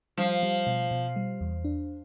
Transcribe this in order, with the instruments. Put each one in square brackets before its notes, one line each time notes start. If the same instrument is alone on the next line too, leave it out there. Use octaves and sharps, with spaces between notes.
[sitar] F3 [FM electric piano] G3
[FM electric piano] G3
B2
B2
G3
E2
D4